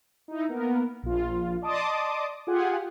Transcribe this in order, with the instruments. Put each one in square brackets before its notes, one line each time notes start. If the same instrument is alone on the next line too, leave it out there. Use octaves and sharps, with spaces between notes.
[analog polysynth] D#4 E4
A#3 B3 A#4
A#1 F4
D5 D#5 A5 C6 D6 D#6
F4 G4 G#4 F#5 G#5